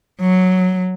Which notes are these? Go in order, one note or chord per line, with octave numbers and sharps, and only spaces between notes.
F#3